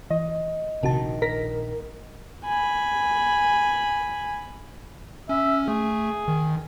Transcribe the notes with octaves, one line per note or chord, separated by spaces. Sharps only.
E3 D#5
A#1 C3 D#3 F#4 A5
A#4 A#6 B6
G#5 B5
C#4 E5
A3 G#4
D#3